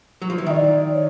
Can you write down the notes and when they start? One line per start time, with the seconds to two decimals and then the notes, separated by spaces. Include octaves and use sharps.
0.22 F#3
0.30 F3
0.38 E3
0.46 D#3 D5 E5
0.93 C#5